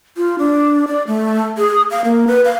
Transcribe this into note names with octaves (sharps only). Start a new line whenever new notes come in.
F4
D4
D5
A3
G#4
F5
A#3
B4
F5